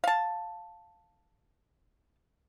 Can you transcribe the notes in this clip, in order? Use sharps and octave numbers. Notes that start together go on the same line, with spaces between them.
F5 A5